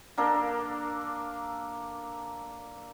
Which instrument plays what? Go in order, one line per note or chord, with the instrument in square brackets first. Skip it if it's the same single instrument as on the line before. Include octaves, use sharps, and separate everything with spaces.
[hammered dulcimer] A#3 D4 A4 A#4